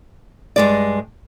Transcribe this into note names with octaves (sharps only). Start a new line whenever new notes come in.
G2 G#3 D5